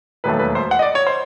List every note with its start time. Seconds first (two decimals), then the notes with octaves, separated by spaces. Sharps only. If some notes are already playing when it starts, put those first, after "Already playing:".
0.24 E1 D#2 D#3 F#3 A3 B4
0.39 B4
0.55 C5
0.71 F#5
0.79 D#5
0.82 D5
0.95 C#5
1.07 C5